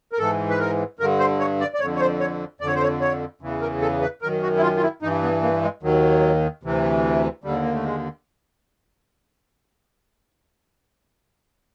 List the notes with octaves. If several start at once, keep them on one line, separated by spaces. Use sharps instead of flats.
A#4
G#2 E3 A4
B4
A#4
G2 D3 A#4
C5
C#5
D5
D5
F2 D3 C#5
C#5
C5
C#5
F2 D3 C#5 D5
C5
C#5
C#5
E2 C#3 E3
A#4
A4
B4
F#2 D#3 A#4
F#4
E4
F4
F4
E4
G2 E3 D#4
B3
A#3
G#3
D#2 D#3 F#3
D2 C3 E3
D#2 D3 G3
A#3
A3
G#3